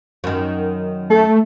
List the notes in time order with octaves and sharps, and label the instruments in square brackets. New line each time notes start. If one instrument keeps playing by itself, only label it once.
[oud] F#2 D#3
[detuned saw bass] A3 [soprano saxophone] A4